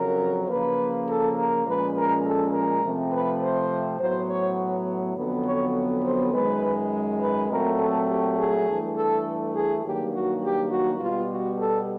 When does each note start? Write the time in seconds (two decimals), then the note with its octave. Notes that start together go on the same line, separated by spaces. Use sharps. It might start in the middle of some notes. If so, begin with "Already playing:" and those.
Already playing: F2 C#3 F#3 A#4
0.49 C#3 F3 A#3 B4
1.08 A4
1.37 A#4
1.66 A#2 F3 G#3 C#4 B4
1.95 A#4
2.25 A4
2.53 A#4
2.83 C3 F3 A3 C4
3.12 B4
3.41 C5
3.99 A2 F#3 B3 C5
4.28 C#5
5.16 F2 D3 F#3 B3
5.45 C#5
6.03 C5
6.33 F#2 D#3 G#3 B4
7.21 B4
7.49 A#2 F#3 A3 C4 A#4
7.79 A4
8.08 G4
8.37 G#4
8.66 G2 E3 A3
8.95 A4
9.54 G#4
9.83 G2 D#3 F#3 A#3 G4
10.12 F#4
10.42 G4
10.71 F#4
10.99 B2 G3 B3 F4
11.29 F#4
11.58 A4